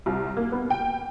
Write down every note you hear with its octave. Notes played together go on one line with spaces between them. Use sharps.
C2
A#3
B3
G5